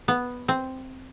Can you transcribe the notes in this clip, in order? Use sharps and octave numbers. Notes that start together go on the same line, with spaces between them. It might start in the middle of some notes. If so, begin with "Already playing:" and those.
B3
C4